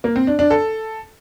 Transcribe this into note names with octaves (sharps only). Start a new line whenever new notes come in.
A#3
C4
D4
D4
A4